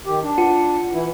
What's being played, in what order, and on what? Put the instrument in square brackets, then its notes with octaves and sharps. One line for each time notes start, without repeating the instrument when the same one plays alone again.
[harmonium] D#3 G4
D4
[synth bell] F4 F#5 C#7
[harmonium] E3 E4